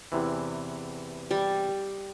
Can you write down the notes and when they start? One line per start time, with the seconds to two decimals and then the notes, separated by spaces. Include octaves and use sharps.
0.12 E2 C3 E3
1.31 G3